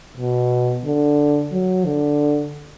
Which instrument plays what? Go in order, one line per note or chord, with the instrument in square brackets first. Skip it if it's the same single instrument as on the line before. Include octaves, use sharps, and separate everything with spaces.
[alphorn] B2
D3
F#3
D3